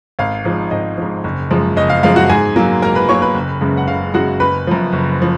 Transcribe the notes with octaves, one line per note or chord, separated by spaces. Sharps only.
G#1 F5
G#2 F3
G#1 D#5
G#2 F3
F#1
F#2 F3 G#3
F#1 D#5
F5
F#2 F3 G#3 F5
F#4 F#5
G#2 G#4 G#5
F#3 A#3
G#2 A#4 A#5
B4 B5
F#3 A#3 C#5 C#6
B4 B5
F#1
F#2 C#3 G#3
F#5
F#1 F5
F#2 C#3 G#3 F#4 F#5
F#1 B4 B5
F#2 F3
F#1
F3